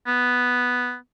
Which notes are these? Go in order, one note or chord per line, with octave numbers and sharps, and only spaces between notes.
B3